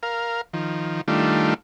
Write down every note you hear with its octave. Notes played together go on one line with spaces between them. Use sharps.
A#4 F5
D#3 F3
D#3 G3 A3 D4 F4